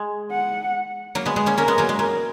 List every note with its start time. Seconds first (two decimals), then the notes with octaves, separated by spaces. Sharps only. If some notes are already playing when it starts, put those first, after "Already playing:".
Already playing: G#3
0.32 F#5
1.15 F#3 A#3
1.26 G#3 B3
1.36 G#3 B3
1.46 A#3 C#4
1.58 A#3 C#4 A#4
1.68 G#3 B3
1.78 F#3 A#3
1.89 G#3
1.99 F#3 A#4